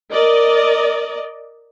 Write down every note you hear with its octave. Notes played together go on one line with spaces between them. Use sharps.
A#4 D5 D#5